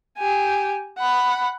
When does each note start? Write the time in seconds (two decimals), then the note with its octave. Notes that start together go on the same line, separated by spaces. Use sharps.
0.18 G4 G#5
0.98 F#5 B5